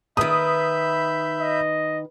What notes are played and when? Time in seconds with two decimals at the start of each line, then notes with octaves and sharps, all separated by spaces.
0.17 D#3 B4 E5 B5 D#6 G6
1.40 D#5